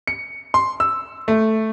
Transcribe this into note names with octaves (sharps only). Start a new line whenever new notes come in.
C#7
C6
E6
A3